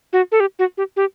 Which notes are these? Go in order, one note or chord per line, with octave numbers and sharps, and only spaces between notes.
F#4
A4
G4
F#4
G4
G4